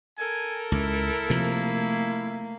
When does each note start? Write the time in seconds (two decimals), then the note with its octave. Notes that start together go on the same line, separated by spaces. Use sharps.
0.18 A4 A#4 G#5
0.72 C#2 E4
1.30 C3 F3 A3 A#3